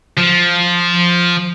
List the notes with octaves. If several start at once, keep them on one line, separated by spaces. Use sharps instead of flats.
F3